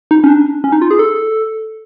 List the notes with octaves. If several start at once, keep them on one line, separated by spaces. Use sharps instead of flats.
D#4
C#4
D4
C#4
D#4
F4
G#4
A4